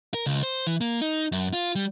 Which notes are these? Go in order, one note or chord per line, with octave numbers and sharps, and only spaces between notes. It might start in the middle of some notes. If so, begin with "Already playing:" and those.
A#4
C#2
C5
E3
A#3
D#4
F#2
F4
G3